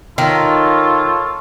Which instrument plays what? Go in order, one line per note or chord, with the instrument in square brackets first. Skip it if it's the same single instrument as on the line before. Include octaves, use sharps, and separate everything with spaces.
[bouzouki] D#3 [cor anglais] F4 [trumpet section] A4 C#5